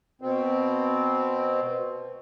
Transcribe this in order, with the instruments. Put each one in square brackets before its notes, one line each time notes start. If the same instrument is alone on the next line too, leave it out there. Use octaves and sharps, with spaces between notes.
[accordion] B2 C4